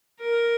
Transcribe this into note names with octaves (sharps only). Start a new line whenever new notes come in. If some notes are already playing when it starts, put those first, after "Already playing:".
A#4